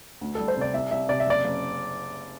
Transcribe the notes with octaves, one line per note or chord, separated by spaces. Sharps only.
D2
G3 A4
C5
C3 D5
C2 E5
C2 E5
C3 D5
E5
F#1 D5
F#1